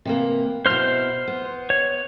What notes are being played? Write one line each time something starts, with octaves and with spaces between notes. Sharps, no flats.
C3 E3 A#3
B2 E4 C5 F6
B3
C#5